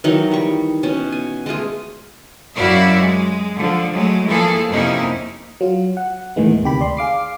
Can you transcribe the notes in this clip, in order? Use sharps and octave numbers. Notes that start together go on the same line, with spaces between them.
D#3 E3 F#3 D#4
G3 C#6
B2 C#4
G#5
G#3 A3 F4 G#4
F#2 E4 F#4 D5 E5 F5
G#3
D3 F3
F#3 G#3 A3
E3 F3 A#3 G#4 A4
F2 C3 A#3 C#4 D#4 E4
F#3 F4
F#5
D#2 A2 D#3 E3 G#3 B3
D2 C3 D#3 G4 B5
D5 C6
G#4 F5 D6 C7